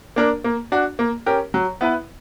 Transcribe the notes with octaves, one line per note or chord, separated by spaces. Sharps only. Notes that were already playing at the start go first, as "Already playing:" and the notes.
A#3 D4 A#4
A#3
D4 F#4
A#3
C#4 G4 A#4
F#3
B3 E4 B4